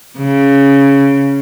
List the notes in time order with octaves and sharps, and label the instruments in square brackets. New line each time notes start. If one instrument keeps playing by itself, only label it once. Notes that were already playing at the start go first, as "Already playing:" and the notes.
[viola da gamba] C#3